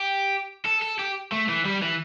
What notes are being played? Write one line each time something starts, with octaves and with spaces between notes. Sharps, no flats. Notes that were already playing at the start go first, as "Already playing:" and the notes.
Already playing: G4
A4
A4
G4
A3
E3
G3
E3